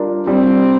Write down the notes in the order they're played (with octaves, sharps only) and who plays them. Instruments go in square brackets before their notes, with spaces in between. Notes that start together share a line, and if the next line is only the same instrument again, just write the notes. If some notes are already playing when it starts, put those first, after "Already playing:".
Already playing: [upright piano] G3 D4 F4 A#4
[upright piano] G3 [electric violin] C4